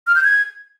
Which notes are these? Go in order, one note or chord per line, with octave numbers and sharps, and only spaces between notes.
F6
G6
G#6